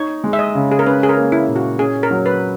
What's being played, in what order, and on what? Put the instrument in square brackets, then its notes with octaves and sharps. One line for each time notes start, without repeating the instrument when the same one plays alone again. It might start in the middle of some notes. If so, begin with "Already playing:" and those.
Already playing: [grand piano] D#4 [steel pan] C#5
[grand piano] G#3
[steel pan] E5
D#5
[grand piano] C#3
[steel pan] G#4
A#4
[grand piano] C#4 [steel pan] B4
[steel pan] G#4
A#4
[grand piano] A#3
[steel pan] E4
[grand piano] A#2
[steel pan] F#4
[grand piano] C#4 [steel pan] G#4
[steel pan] A#4
[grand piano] F#3
[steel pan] B4